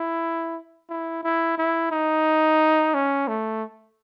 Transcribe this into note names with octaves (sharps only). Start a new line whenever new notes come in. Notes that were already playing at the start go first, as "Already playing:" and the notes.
Already playing: E4
E4
E4
E4
D#4
C#4
A3